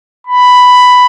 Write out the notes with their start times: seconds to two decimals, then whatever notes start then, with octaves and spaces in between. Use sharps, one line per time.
0.27 B5